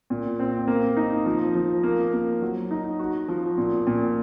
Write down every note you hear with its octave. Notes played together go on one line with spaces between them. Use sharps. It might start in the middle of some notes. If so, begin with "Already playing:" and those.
A#2
C4
A#3
D#4
F3
F3
A#3
A#3
F#3
D#4
F#4
F3
A#2
A#2